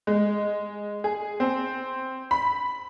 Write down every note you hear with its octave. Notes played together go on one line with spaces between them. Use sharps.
G#3
G#4
C4
B5